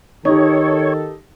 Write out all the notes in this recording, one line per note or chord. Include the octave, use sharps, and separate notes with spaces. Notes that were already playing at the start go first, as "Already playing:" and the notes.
D#3 D#4 G4 A4 C#5